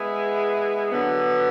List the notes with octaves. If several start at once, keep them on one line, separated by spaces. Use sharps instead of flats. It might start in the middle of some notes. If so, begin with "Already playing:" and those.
Already playing: G#3 B3 E4 G#4 B4
D3 F#3 B3